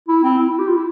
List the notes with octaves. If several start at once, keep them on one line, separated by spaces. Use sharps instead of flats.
E4
C4
E4
E4
G4
F4
E4